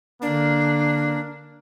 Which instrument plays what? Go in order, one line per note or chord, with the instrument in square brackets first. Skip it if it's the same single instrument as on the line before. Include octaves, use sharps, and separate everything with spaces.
[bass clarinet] D3 [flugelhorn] A#3 [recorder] D4